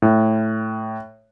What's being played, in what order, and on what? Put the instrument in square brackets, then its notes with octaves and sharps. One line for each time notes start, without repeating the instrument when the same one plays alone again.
[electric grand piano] A2